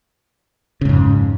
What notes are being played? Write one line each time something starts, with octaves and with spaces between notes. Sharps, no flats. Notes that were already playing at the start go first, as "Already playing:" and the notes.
F2 G#2 C#3